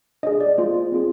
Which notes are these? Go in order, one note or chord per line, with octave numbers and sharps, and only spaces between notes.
D4 G#4 D#5
D5
A#3 F4 G#4 C5
C4 F4 G#4